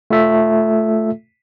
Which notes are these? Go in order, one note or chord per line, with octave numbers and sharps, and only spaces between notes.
A3 F4 A4 E5